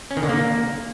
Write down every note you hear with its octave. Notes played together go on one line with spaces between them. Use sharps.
C#4
D#3
D3
A#3